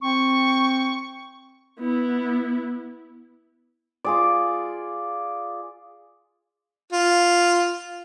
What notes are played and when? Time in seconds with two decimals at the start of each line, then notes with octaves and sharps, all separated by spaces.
0.01 C4 C#6
1.79 B3 E4
4.05 F4 G#4 D5
6.93 F4